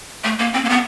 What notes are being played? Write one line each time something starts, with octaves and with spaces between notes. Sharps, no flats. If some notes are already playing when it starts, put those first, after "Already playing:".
A3
A#3
C4
A#3
B3